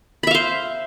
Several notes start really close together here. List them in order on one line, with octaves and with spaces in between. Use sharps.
B5 E5 F5 C5